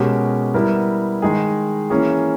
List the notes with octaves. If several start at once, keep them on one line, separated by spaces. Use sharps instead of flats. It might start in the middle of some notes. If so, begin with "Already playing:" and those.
Already playing: B2 G#3 C#4 G4 A#4
G3 B3 E4 A#4
D#3 G#3 D#4 G#4
E3 A#3 C#4 G#4